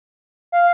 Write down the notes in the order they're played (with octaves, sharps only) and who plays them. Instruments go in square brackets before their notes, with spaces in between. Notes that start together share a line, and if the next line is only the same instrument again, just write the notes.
[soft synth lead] F5